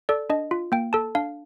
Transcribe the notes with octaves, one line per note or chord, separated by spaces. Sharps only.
A4 D5
D4 D#5
F4
A#3 G5
A4 A5
D4 F5